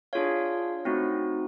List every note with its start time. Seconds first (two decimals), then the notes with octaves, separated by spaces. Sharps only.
0.13 D4 F4 G#4 C#5 F5
0.85 A3 C4 D#4 F#4